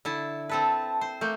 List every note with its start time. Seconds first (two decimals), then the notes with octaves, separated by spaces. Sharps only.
0.05 D3 E4 A5
0.49 C4 A4 B4 A5
1.01 C5
1.21 A3 A#3 G6